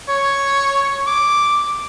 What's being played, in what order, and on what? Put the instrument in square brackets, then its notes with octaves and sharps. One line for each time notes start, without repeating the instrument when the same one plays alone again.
[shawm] C#5
D6